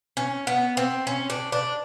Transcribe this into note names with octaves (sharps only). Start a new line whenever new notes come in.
C#4
B3
C4
C#4
D4
D4